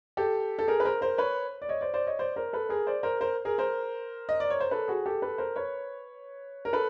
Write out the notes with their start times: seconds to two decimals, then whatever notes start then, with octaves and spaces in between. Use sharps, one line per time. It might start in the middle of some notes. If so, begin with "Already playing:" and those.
0.17 G4 A4
0.59 A4
0.68 G#4 A#4
0.80 B4
0.85 A#4 C5
1.01 A#4 C5
1.18 B4 C#5
1.62 D5
1.69 C#5 D#5
1.81 C5 D5
1.94 C5 D5
2.07 C#5 D#5
2.19 C5 D5
2.36 A#4 C5
2.53 A4 B4
2.69 G#4 A#4
2.87 C5 D5
3.03 A#4 C5
3.21 A#4 C5
3.45 G#4 A#4
3.58 A#4 C5
4.29 D#5
4.40 D5
4.50 C#5
4.60 C5
4.71 A4 B4
4.88 F#4 G#4
5.06 G4 A4
5.22 A4 B4
5.38 A#4 C5
5.56 B4 C#5
6.65 A#4
6.73 A4 B4